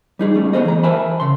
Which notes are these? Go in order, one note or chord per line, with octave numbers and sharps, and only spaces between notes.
G3 D#4 G#4
G3 A3 C#4
A3 B3 G#4 A4 C5 D#5
E3 A#5
A#4 C5 E5 G#5 A5 B5
C#3 C6